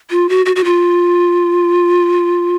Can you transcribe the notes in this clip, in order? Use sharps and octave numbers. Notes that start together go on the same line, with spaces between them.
F4
F#4
F#4
F#4
F4